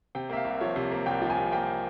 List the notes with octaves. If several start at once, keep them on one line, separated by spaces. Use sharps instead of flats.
C3 G5
A#3 E5
F5
C2
F3 C#5
C3
A#3
C2 G5
F3
G#5
C3
A#3 G5